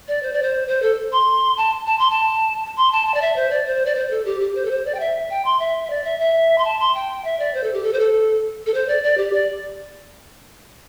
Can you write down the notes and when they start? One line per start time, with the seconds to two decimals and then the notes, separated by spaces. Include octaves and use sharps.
0.08 D5
0.23 C5
0.33 D5
0.43 C5
0.68 C5
0.82 A4
1.12 C6
1.57 A5
1.87 A5
1.99 C6
2.10 A5
2.77 C6
2.92 A5
3.07 A5
3.14 D5
3.22 E5
3.36 C5
3.51 D5
3.66 C5
3.86 D5
3.95 C5
4.11 A4
4.26 G4
4.41 G4
4.55 C5
4.65 A4
4.71 C5
4.86 D5
4.95 G5
5.00 E5
5.30 G5
5.45 C6
5.60 E5
5.85 E5
5.90 D5
6.05 E5
6.20 E5
6.58 C6
6.65 A5
6.79 C6
6.95 G5
7.25 E5
7.39 D5
7.54 C5
7.64 A4
7.73 G4
7.83 A4
7.93 C5
7.99 A4
8.66 A4
8.74 C5
8.88 D5
9.04 D5
9.18 G4
9.33 D5